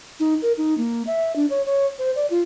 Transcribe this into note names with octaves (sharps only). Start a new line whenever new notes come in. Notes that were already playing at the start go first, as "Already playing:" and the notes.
D#4
A#4
D#4
A#3
E5
D4
C#5
C#5
C5
D5
F4